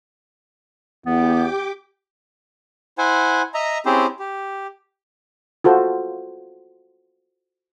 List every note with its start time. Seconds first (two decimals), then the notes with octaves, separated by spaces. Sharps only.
1.06 E2 B3 G4 G5 D6
2.98 E4 C5 F#5 G#5
3.54 D#5 E5 A#5
3.86 C4 C#4 E4 G4 G#4 C5
4.20 G4
5.64 F4 F#4 A4 C5